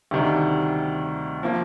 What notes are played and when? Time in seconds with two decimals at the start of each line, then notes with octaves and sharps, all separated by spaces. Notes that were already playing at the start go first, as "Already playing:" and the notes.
0.11 D2 C3 D#3 G3
1.43 F3 A#3